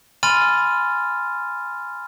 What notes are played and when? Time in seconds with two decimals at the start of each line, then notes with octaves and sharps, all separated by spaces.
0.23 G#5 B5 C6 F6 A6 D#7